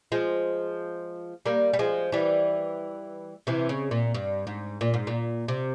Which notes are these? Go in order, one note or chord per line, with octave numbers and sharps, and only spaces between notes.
F3 G#3
G3 A#3
G3
F3 G#3
E3 G3
C3 E3
C#3
A#2
G2
G#2
A#2
G#2
A#2
C3